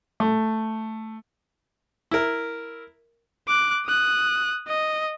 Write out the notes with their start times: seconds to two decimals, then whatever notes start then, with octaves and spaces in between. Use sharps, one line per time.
0.20 A3
2.11 E4 A#4
3.48 D6 F#6
3.86 D#6 F#6
4.68 D#5